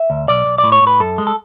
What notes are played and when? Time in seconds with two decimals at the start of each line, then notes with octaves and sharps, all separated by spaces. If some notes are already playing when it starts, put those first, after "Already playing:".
Already playing: E5
0.10 D2
0.28 B1 D5
0.46 B1
0.58 D5
0.64 A2
0.72 C#5
0.82 A2 B4
1.00 F#2 A4
1.18 G#3
1.27 A4